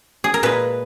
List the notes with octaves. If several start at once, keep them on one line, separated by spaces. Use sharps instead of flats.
G#4
A#4
A#2 G#3 B4